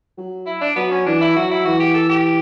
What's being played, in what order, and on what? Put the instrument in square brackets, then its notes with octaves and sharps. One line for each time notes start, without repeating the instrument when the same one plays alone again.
[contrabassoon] F#3
[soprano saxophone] E4
D4
[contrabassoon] F#3 [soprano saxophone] B3
[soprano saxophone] C#4
[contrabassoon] E3 [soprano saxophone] D4
[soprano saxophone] E4
[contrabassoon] F#3 [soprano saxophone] F#4
[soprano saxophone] E4
[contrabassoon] E3 [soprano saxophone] F#4
[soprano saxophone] G4
A4
G4